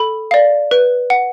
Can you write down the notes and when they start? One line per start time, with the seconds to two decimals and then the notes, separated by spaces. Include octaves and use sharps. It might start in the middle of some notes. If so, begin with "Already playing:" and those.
Already playing: A4 B5
0.31 D5 F5
0.71 B4
1.10 F#5